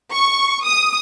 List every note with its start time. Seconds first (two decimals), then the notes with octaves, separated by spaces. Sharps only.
0.12 C#6
0.64 D#6